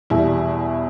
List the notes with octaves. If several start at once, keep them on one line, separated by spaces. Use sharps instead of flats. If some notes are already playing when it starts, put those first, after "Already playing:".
E2 B2 G3 E4